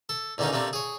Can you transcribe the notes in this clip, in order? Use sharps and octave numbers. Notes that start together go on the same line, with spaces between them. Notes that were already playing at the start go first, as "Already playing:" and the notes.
A4
E2 D3 D#3 A#3 C#4 D#4
C3 A3 A#3 C4 D4
G#4 C#5